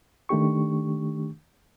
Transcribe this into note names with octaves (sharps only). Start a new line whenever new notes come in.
D#3 A3 D4 G4 C#6